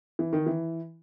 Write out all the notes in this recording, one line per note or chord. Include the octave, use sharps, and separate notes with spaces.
E3
D#3
E3